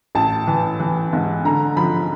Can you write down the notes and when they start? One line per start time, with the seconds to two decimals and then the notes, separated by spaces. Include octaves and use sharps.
0.15 A1 A5
0.47 E3
0.80 E3
1.13 G#2
1.44 D3 A#5
1.77 F3 B5